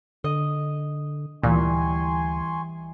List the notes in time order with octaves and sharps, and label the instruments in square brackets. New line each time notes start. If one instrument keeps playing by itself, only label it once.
[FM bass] D3 [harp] D#5
[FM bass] D2 [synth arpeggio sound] A#2 [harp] E3 G3 [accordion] G#5 C6 C#6